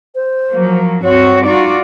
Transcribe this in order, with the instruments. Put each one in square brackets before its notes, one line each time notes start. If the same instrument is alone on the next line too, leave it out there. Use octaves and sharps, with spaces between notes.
[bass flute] C5
[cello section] F3 F#3 A#3
[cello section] G2 C4 F#4 [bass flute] C#5
[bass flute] D#4 [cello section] F4 F#4 D5